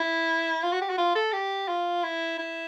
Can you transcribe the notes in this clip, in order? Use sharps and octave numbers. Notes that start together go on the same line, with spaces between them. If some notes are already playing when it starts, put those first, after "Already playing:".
Already playing: E4
F4
F#4
G4
F#4
F4
A4
G4
F4
E4
E4